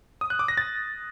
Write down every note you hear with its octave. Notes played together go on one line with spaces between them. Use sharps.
D#6
F#6
D6
A#6
A6